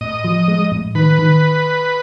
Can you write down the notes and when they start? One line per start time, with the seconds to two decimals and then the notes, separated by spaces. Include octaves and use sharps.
0.01 A2 D#5
0.24 F3
0.48 G#3
0.72 A2
0.95 D#3 B4
1.19 D#3